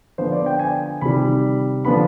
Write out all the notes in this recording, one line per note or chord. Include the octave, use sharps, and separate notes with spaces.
D3 F3 B3 D4 C5
D5
G5
G#5
C3 D#3 G3 B5
D3 F3 B3 D4 B5